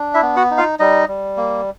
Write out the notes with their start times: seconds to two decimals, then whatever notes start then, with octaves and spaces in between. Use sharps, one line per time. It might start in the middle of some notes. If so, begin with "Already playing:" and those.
Already playing: D4
0.14 E4 E5
0.22 B3
0.36 F#4 F#5
0.51 D#4
0.58 F4 F5
0.79 G3 D#4 D#5
1.08 G3
1.37 A#3